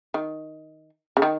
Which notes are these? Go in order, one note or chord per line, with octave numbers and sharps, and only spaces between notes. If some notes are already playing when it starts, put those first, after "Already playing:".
D#3
C#3
D#3